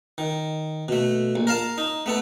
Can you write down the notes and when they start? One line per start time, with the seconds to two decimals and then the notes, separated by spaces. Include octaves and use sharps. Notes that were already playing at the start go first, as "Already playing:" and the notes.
0.18 D#3
0.88 B2 A3
1.36 A#1
1.47 A#4 F5 A5
1.78 D#4
2.06 A3 B3 A4